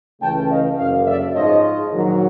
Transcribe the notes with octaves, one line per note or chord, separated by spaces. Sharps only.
C#2 C#3 E3 A3 C#4 G5 A5
D#5 F5
F#1 F#2 D3 D#5 F5
D5 E5
G#2 F3 G#3 C#5 D#5
A#1 G#2 D#3 F#3